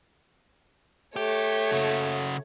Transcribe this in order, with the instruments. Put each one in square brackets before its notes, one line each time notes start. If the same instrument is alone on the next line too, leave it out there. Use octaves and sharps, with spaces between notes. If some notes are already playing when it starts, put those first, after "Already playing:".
[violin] A3 C#5 [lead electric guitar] G4
[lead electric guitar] C#3 F#4